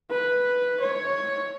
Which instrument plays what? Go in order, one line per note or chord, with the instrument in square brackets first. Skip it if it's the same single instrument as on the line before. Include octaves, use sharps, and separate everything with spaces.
[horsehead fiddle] B4
C#5